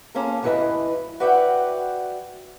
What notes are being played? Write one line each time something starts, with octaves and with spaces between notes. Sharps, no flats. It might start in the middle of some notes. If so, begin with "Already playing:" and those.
A#3 C#4 F4 G#4 A4
D2 G2 E3 E4 B4 D#5
F#4 B4 D5 E5 F#5 G5